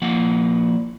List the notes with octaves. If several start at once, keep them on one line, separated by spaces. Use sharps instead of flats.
F3 A#3 F#5